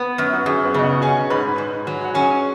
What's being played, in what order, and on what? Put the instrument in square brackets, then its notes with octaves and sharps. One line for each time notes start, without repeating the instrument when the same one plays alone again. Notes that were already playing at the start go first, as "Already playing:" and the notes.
Already playing: [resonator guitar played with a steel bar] B3
F#2
[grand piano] F#4
[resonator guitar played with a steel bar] F#2 [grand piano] G#4
[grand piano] B3 B4
[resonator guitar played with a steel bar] C#3 [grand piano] D#5
[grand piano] F#4 F#5
[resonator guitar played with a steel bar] C#4 [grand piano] G#4 G#5
[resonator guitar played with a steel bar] G#2 [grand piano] B4 B5
[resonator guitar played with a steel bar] G#2
F#3
[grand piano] F#5
[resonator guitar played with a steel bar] C#4 [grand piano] G#4 G#5